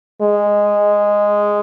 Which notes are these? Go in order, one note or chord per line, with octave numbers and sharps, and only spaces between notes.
G#3